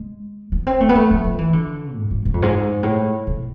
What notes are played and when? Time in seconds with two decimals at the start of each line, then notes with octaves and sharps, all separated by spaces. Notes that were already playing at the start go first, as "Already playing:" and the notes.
Already playing: G#3
0.52 B3
0.67 C4
0.80 A3
0.89 B3
0.95 A3
1.10 F3
1.24 F3
1.38 E3
1.53 D3
1.96 G#2
2.11 G#2
2.25 G#2
2.34 F2
2.42 G#2
2.83 A2
3.27 B2